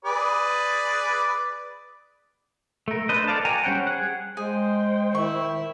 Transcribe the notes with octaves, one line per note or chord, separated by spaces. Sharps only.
G#4 B4 D5
A3 A#4
D4 B4 C5 D#5
A4 D5 F5 A5
F#4 G5 G#5 A#5
G3 C#4 C5 F#5 G5
G#4 F#5
G#3 G#4 C5 G5
D#3 E4 C#6